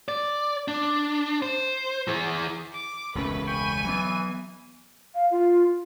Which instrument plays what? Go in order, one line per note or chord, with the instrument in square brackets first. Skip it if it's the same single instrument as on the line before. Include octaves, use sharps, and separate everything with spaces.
[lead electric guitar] D5
D4
C5
E3 G#4
[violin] D6
[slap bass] E1 C#2 C#4 [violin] A3 B4
[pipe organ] G5 B5 C#6 [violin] G#5 D#7
[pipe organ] E3 [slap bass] F#3 B3
[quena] F5
F4